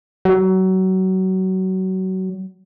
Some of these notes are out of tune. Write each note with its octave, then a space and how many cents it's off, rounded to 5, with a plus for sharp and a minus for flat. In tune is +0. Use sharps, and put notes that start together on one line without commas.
F#3 +25